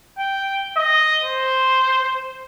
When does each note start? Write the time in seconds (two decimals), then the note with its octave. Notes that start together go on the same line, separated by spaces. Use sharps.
0.19 G5
0.77 D#5
1.24 C5